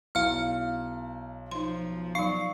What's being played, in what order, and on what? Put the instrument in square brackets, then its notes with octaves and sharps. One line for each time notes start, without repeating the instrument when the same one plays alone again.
[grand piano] B1 [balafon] E4 [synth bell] F5 F6
[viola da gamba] F3 [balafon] D#4 C6
[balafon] F#3 D#4 [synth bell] F5 C#6 C7